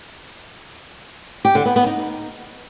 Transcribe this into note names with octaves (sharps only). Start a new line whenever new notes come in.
G4
D3
B3
B3
D#4